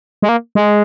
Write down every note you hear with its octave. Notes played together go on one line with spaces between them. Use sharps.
G#3
A#3
G#3